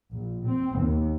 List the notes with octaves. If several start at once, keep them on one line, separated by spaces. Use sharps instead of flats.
A#1
C4
D#2